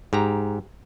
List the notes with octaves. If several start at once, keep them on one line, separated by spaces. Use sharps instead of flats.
G#2 G4 A#5